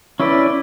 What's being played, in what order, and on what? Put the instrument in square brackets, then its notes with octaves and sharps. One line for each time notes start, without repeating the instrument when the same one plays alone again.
[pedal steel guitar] C#4 E4 B4 D5